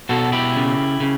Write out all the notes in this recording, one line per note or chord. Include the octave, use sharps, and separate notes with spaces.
B2 F#4 A4
E4 G4
C#3
C#3